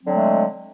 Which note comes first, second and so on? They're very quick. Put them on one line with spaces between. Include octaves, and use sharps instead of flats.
C4 F#3 D3 G#3 A3